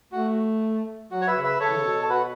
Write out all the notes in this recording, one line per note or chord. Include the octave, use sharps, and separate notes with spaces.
A3 F#4
F#3 F#4
C#5
B4 E5
C#3
B4 E5
C#3 A4 C#5
E3
C#3
B2
A4
F#4 B4